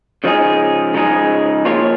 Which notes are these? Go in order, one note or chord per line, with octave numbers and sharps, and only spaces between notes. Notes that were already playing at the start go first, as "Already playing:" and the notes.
C#3 F3 G#3 D#4 G#4
C#3 F3 G#3 D#4 G#4
F3 A#3 F4 C#5